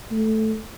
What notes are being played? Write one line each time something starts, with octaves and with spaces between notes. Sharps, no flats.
A3